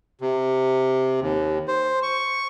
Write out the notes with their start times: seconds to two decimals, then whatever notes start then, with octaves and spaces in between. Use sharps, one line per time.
0.21 C3
1.20 D#2
1.68 C5
2.03 C#6